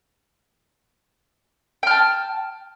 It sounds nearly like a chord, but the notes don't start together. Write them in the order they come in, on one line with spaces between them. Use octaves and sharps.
G5 F6 A5